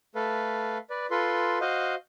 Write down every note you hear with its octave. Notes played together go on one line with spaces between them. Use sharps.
A3 A4 B4 F5
B4 D5
F4 A4 B4 C6
F#4 C5 D#5 F5